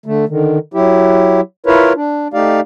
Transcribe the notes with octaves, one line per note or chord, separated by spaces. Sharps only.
D3 A3
D3 D#3
F#3 E4 G4
E4 F4 A#4 B4 C#5
D4
A3 D#4 G4 D5 F5